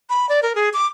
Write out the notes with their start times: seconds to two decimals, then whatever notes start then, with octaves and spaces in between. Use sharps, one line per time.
0.10 B5
0.29 D5
0.43 A#4
0.55 G#4
0.73 D6